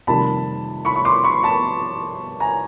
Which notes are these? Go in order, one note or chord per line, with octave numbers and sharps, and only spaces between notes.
F2 C3 D#3 G3 A#3 A5 B5
B5 C#6
C#6
C6 D6
B5 C#6
A5 B5
G#5 A#5